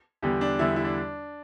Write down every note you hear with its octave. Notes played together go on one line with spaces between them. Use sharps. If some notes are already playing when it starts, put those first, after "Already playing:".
E2 D3 G3 G4
D4
E2 D3 G3 E4
E4
D4